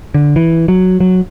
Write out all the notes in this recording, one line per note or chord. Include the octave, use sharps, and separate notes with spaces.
D3
E3
F#3
F#3